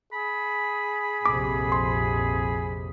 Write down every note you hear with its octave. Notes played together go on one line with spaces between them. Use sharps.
G#4 B5
A#1 F2 C3 D6
C6